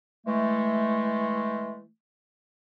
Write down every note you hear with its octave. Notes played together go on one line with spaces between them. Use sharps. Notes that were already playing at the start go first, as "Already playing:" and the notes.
E3 G#3 A3